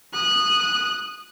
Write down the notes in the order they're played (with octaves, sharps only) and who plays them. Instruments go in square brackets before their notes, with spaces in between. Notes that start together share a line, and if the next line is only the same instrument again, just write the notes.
[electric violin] D#6 F#6